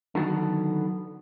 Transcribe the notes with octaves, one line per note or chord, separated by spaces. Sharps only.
D3 D#3 F#3 B3 F#4 A4